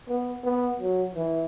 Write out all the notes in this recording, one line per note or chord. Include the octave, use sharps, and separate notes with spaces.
B3
B3
F#3
E3